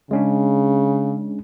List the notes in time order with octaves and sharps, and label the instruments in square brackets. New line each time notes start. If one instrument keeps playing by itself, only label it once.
[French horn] C#3 [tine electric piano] G#3 C#4 D4